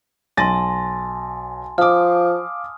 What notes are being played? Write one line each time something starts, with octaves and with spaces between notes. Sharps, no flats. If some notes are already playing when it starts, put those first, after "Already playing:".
B1 G#5 A5 C6 A6 A#6
F3 F5 D6 D#6 F6